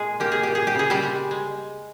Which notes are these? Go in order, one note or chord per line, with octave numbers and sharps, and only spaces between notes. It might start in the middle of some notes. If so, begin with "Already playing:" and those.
Already playing: A#2 G#3 G#4
A#3 G4
G#4
A#2 G4
G#4
G4
C#3 G#4
G3 G4
G#3
G#3